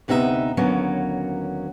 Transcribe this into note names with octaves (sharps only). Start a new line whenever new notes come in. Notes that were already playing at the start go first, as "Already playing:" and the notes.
D2 C3 B3 D#4 E4 E5
D#2 D3 F#3 A#3 B3 C#4